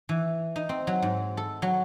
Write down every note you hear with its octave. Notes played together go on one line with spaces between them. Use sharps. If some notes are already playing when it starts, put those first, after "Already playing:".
E3
D#4
C4
F#3
G#2
A4
F#3